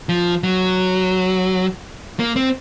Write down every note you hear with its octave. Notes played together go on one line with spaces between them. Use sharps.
F3
F#3
A#3
C4